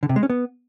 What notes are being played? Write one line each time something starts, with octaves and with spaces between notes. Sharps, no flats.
D3
C3
G#3
C#4
B3